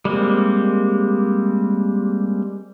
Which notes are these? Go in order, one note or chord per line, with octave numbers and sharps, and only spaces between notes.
G3 G#3 A#3 C4